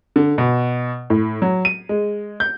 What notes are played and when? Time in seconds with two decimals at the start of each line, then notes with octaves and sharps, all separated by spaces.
0.16 D3
0.38 B2
1.10 A2
1.42 F#3
1.65 D#7
1.89 G#3
2.40 G6